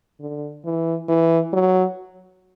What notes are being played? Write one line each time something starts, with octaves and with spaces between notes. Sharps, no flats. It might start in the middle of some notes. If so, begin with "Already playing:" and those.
D3
E3
E3
F#3